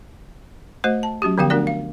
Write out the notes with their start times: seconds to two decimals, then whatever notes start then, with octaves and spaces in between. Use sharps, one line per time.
0.84 A3 F#4 C5 D#5
1.03 A5
1.22 F#3 C#4 F#4 G4
1.38 D3 F3 B3 G4 F5 G5
1.50 A3 D4 F#4 A#4 D5
1.67 F5